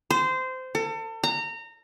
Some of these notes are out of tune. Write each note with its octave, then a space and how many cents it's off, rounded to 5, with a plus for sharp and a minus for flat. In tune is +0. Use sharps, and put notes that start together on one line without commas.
C5 -20
A4 +35
A#5 -25